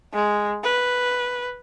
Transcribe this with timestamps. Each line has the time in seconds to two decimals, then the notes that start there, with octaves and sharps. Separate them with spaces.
0.13 G#3
0.63 B4